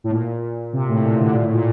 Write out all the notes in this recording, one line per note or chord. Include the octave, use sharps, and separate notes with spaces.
A2
A#2
C3
A2
C3
A#2
D3
A#2
A2
A#2